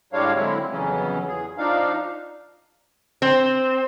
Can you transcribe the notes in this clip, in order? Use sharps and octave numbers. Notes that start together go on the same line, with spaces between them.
A2 G3 G#3 D4 C#5 F5
D3 F#3 G#3 C4 E4
F2 C#3 E3 F#3 B3 C#4
E2 G#4
F3 D4 D#4 F5
C4